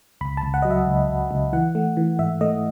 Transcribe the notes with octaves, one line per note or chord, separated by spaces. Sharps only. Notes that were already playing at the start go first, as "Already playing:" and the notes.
C#2 B5
A5
C#2
F#5
F#3 D#5
E5
C#2
C#2
C#2
E3 F#5
A3
E3
G#2 E5
A3 D#5